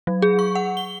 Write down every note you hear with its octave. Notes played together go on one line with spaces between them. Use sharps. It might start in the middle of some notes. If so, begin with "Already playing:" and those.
F#3
G#4
C#6
F#5
G7